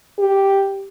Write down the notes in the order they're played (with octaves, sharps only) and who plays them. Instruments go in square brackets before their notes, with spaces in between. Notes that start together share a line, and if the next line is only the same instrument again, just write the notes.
[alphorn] G4